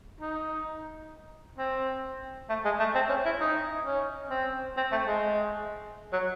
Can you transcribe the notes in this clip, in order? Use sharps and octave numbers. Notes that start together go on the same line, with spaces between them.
D#4
C4
A3
G#3
A3
C4
C#4
E4
D#4
C#4
C4
C4
A3
G#3
F#3